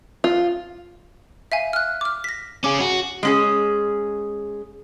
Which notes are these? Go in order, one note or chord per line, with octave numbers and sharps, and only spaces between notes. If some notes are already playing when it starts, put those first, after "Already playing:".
F4
E5 F5 G#5
F6 F#6
D6 F6
A#6 B6
C#4 G#4 D6
F#4
G#3 C#4 G#4